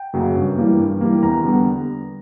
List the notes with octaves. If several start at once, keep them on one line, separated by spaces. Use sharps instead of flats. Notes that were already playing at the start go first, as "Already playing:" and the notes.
Already playing: G5
F#2 C#3 F#3 A#3
G2
E3 G3 A#3
G2
E3 G3 A#3
E2 A#5
D3 G3 B3